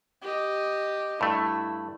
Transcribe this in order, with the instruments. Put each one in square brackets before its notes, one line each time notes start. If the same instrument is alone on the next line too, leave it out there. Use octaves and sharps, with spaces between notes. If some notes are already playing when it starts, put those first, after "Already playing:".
[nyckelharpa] G4 D#5
[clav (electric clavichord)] G2 A3 [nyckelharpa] E4